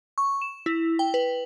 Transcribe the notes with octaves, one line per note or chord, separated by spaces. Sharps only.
C#6
E7
E4
G5
B4